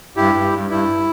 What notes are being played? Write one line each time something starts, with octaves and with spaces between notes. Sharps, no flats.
G2 E4 G4
G2
G2
G2 E4